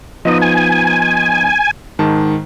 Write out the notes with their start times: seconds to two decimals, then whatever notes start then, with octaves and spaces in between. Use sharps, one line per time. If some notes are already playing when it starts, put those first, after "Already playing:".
0.25 F3 B3 D#4 D#5
0.42 G#5
1.99 G#2 D#3 A5